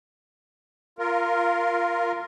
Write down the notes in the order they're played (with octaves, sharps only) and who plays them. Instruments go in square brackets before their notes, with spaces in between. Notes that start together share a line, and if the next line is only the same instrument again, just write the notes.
[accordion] F4 A#4